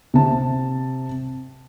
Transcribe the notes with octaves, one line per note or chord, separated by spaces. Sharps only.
C3 A5